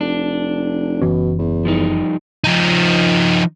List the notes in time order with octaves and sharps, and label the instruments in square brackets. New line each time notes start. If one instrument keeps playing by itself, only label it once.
[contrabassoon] F1 [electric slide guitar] D4
[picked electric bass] F#1 E3 C#4 [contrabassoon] B2
[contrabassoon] E2
[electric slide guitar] F3 G3 D#4
[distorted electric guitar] F3 D#4